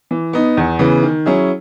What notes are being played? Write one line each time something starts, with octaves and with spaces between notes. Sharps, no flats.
E3
B3 D#4
E2
C#3 E3 B3
D#3
F#3 C#4 E4 G#4